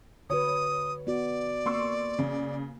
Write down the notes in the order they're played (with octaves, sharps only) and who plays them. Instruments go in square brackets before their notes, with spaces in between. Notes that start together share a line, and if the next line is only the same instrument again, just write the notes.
[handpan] D3 F#4 B4 [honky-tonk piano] C#5 [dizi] D#6
[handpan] B3 F#4 [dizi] D5
[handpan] A#3 [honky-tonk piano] C6 C#6 E6
[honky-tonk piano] C#3